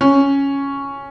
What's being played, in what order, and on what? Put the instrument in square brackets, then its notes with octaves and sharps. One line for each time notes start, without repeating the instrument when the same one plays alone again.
[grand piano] C#4